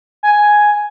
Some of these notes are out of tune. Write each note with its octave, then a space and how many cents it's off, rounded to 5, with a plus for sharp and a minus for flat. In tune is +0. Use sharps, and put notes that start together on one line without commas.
G#5 +5